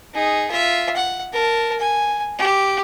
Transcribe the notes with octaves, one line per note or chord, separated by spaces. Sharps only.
D#4 G#4
F4 E5
F#5
A#4 A5
G#5
G4